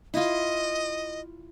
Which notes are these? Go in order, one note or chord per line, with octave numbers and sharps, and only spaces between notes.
E4 F4 D#5